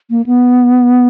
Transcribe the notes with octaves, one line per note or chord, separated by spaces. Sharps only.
A#3
B3